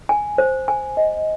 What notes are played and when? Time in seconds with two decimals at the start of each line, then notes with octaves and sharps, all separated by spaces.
0.09 G#5
0.38 C5
0.68 G#5
0.97 D#5